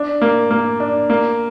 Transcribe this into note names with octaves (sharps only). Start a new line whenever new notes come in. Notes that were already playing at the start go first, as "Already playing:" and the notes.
Already playing: D4
A#3
A#3
D4
A#3